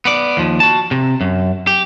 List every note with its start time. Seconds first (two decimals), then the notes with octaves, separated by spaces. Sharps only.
0.05 B3 D5
0.37 D#2 F3
0.60 F#4 A5
0.91 C3
1.21 F#2
1.67 G4